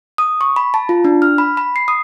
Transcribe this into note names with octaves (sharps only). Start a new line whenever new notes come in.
D#6
C#6
B5
A5
F4
D4
F6
B5
B5
C7
D#6